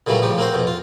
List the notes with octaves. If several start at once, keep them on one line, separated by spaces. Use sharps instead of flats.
A#2 C#3 E3 F#3 G3 A3
A1 C#3 F3 G4
A#3 C4 F#4 C5
F2 B2
F4